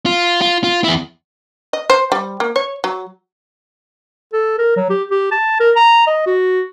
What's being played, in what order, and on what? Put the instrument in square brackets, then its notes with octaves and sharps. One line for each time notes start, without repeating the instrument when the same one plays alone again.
[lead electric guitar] F4
F4
F4
E2 E4
[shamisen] D#5
C5
G3
A#3
C#5
F#3
[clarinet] A4
A#4
F#3
G4
G4
A5
A#4
A#5
D#5
F#4